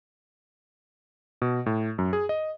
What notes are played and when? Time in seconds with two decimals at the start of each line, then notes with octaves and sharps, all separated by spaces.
1.42 B2
1.66 A2
1.98 F#2
2.13 G#4
2.29 D#5